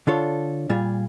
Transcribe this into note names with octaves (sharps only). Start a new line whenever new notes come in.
D3 D4 F4 A4 C#5
A#2 G3 F4 G#4